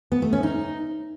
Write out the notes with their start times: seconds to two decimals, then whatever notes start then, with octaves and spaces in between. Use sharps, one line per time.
0.12 B3
0.22 A3
0.33 C#4
0.43 D#4